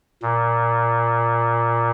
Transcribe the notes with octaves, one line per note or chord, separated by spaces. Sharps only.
A#2